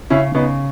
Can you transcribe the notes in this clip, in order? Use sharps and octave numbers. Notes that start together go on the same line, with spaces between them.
C#3 C#4 E4
C#3 B3 D#4